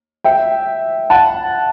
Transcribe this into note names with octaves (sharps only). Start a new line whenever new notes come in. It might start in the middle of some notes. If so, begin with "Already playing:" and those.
E5 G5
F#5 A5